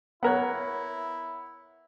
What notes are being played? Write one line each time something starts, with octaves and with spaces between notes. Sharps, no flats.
B3 E4 A#4 C#5 F#5 F#6